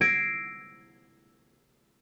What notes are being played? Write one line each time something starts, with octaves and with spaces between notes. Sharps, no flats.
E6 G#6 A#6 C7 D7 E7